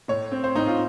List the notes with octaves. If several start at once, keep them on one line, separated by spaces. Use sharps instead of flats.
A2 C#5
C4
C5
A2 D#4
F4